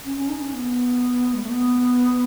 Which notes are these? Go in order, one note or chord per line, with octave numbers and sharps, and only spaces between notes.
C#4
C#4
D#4
C#4
B3
G#3
A3
B3